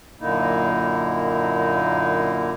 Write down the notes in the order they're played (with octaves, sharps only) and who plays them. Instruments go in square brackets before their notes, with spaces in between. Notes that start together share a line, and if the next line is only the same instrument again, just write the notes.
[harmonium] F#2 A#2 D3 A#3 D#4 E4